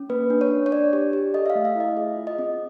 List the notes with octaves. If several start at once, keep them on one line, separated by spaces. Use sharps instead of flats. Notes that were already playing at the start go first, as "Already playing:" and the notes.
Already playing: C#4
A#3 B4
D4
C#5
D4
C#5
D4 D5
G4
G4
A4 D#5
E5
F5
A3
E5
E4 D#5
G#4
F4
D#5
C4